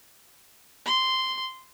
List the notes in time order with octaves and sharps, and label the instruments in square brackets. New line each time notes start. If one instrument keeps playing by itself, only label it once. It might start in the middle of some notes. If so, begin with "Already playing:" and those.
[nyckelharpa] C6